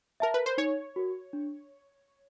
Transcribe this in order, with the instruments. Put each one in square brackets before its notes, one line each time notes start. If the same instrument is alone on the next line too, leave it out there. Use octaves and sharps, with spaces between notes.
[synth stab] A#4 [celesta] E5 A5
[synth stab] B4
C5
[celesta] D#4 [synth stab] C#5
[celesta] F#4 A#4
D4